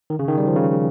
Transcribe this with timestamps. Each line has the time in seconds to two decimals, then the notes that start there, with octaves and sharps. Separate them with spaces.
0.10 D#3
0.19 C#3
0.28 D#3
0.38 G3
0.47 F3
0.56 C#3